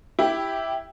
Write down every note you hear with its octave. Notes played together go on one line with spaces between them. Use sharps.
E4 G4